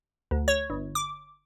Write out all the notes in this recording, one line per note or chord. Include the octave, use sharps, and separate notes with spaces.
D2
C#5
G1
D6